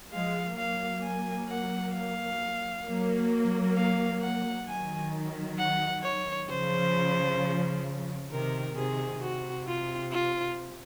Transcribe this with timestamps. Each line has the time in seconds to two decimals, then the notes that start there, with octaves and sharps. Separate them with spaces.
0.13 F3 G#3 F5
0.58 F#3 A#3 F5
1.03 G#5
1.49 F#5
1.94 F5
2.86 F#3 A#3
3.76 F5
4.22 F#5
4.67 D#3 F#3 G#5
5.58 F#5
6.03 C#5
6.49 C#3 F3 C5
8.31 C3 D#3 A#4
8.76 C3 D#3 G#4
9.21 C3 F#4
9.67 F4
10.12 F4